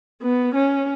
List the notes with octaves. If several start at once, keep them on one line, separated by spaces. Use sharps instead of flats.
B3
C#4